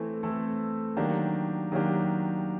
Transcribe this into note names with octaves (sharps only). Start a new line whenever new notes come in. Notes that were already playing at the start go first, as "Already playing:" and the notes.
Already playing: E3 A3 C4 E4 A4
E3 A3 C4 E4 A4
D#3 F#3 A#3 D4 G4
D#3 F#3 A#3 D4 G4